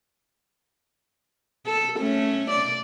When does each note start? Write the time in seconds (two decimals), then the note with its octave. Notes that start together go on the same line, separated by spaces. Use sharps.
1.66 A4
1.99 A3 C#4
2.50 D5